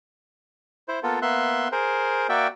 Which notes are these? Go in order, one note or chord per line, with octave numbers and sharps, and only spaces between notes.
E4 C5
A#3 B3 F4 A4
A#3 B3 E5 C6 F#6
G#4 A#4 C5
A#3 F#4 D5 E5 G5